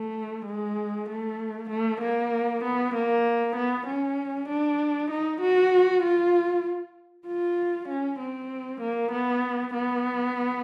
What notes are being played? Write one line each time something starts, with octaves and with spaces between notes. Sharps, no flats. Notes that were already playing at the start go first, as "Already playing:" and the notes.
Already playing: A3
G#3
A3
A3
A#3
B3
A#3
B3
C#4
D4
D#4
F#4
F4
F4
C#4
C4
A#3
B3
B3